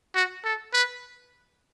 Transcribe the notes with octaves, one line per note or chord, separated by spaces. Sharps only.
F#4
A4
B4